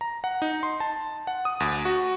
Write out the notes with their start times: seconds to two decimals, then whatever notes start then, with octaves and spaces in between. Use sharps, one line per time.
0.01 A#5
0.24 F#5
0.42 D#4
0.63 C6
0.80 A5
1.27 F#5
1.45 D#6
1.60 D2
1.85 F#4